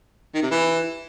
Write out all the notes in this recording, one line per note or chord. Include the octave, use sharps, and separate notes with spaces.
D#3
C3
E3